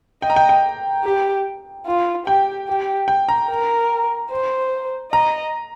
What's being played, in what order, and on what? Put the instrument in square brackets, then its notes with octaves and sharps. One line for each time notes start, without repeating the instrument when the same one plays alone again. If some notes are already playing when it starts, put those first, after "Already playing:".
[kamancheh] D#5 [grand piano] G5
[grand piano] A#5
G5
G5
[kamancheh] G4
F4
[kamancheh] G4 [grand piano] G5
[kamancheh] G4
[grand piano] G5
A#5
[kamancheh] A#4
C5
[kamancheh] D#5 [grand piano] A#5